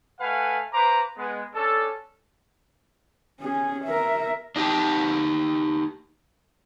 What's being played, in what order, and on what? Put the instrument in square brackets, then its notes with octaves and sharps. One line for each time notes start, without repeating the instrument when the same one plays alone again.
[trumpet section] A3 B4 F5 F#5 G#5
B4 C5 F5 A#5 D6
G#3 B3
C#4 D4 A4
[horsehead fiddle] C#4 G#4
A#4 E5
[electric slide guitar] D4 D#4 G4 G5 A5